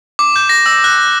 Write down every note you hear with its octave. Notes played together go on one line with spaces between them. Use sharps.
D6
G6
A#6
E6
F#6